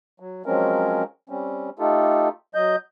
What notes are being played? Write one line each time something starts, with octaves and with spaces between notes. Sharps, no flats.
F#3
F3 F#3 G#3 C4 C#4 A#4
G3 C4 C#4
A3 D#4 F4 G4 A4
F#3 D#5 G6